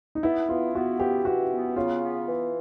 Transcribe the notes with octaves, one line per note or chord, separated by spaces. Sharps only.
D#4
B3 E4
B3 F4
B3 F#4
E3 G4
E3 F#4
B3
C#3 F4
B3
E3